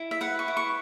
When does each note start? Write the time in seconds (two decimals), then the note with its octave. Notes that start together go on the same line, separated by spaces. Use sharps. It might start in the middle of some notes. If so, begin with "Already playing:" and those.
Already playing: E4
0.11 E5
0.21 B4 F#5
0.39 C#6
0.48 E4
0.57 C#6